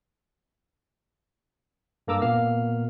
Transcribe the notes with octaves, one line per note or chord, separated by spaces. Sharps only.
G2 A#3 A4 A#5 D6 E6
A#2 A#3 B3 F5 F6